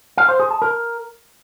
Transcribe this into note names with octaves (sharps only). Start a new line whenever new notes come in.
F5
C5
G#4
A5
A#4